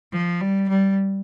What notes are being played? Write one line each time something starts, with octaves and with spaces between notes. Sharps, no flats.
F3
G3
G3